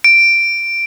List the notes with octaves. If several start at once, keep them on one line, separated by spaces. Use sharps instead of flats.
D7